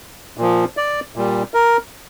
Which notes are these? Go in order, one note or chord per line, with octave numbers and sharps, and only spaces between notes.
A#2 F3
D5
A#2 G3
A#4